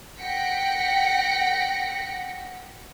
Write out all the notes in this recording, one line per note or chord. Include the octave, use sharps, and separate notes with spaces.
F#5 G5 A#6 B6 C#7 D7